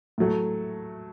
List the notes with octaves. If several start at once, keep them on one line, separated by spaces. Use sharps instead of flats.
A2 F#3 A3